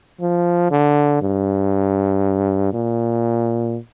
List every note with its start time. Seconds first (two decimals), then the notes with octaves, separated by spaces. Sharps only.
0.21 F3
0.71 D3
1.22 G2
2.73 A#2